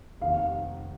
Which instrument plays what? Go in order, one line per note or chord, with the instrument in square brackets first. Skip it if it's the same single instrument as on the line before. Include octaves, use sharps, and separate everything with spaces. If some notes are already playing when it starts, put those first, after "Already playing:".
[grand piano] F1 D#2 D#3 A#3 [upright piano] F5